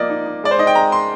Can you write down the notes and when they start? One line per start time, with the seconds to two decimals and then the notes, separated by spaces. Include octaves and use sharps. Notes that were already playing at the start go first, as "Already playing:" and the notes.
Already playing: F3 A#3 D5 D#5
0.10 D#4
0.26 D#4
0.43 G#3 D5
0.51 C5
0.59 D#4 D#5
0.67 G5
0.75 G#3 A#5
0.92 C6